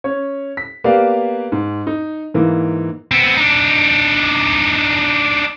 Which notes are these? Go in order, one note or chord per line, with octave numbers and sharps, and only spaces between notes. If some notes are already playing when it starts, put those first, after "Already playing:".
C#4 C#5
B6
A#3 B3 G4 D5 F5
G#2
D#4
G#2 E3 A#3
B3 C4
D4 D#4